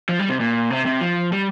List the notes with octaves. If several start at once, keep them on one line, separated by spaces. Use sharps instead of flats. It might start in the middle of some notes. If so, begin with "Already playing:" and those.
F3
G3
C3
A#2
C3
C3
F3
G3